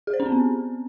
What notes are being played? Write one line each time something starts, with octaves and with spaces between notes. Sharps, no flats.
G#4
C5
C#4
C4
B3